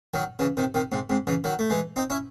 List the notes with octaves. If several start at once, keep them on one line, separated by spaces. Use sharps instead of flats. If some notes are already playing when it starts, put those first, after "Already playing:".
D#3 F#3
C#3 E3
C3 D#3
C3 D#3
G#2 C3
G#2 C3
C#3 E3
D#3 F#3
A3
E3 G#3
C4 D#4
C#4 E4